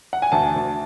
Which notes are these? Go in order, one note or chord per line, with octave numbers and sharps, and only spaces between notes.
F#5
G#5
D2 A5
D2